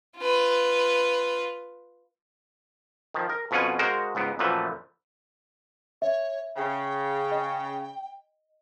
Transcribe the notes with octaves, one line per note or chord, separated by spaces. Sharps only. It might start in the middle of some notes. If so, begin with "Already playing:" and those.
F4 B4
D#3 F3
A#4
F2 B2 C#4 F4 F#5 G#5
G#3 F#4 A#4 C5 F5
C#2 G#2 B3
F#2 A#2 E3 F3 A3 B4
C#5 E5
C#3 G5
D#5